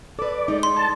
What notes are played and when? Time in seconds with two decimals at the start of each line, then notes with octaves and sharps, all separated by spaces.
0.19 A4 B4 D5
0.48 G#3 D#4
0.63 C6
0.76 A5